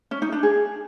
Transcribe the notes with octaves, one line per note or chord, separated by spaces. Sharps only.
C#4
D#4
D4
G#4